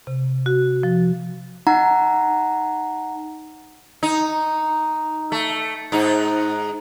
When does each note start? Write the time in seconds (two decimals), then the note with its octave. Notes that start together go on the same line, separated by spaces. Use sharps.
0.07 C3
0.46 F#4
0.83 F3
1.67 D#4 F#5 A#5
4.03 D#4
5.32 A3
5.92 G#2 D#4